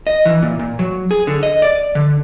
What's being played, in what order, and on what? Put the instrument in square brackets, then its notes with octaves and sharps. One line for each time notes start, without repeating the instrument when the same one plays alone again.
[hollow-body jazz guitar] D#5
E3
A#2
A#2
F#3
G#4
D3
D#5
D5
D3